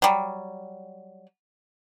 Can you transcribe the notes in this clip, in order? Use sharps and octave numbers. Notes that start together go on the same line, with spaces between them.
F#3 G3